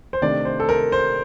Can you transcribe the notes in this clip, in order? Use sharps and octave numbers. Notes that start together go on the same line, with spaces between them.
C5
C3 D#3 A3 D4 D5
C5
A4
A#4
C5